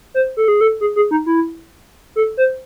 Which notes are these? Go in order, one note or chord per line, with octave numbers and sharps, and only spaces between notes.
C5
A4
G#4
A4
G#4
G#4
D#4
E4
A4
C5